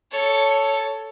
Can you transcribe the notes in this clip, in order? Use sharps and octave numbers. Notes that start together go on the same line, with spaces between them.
A4 C#5